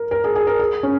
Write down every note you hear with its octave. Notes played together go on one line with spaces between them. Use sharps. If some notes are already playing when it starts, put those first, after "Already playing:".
Already playing: A#4
A#4
G#4
G#4
A#4
G#4
C#4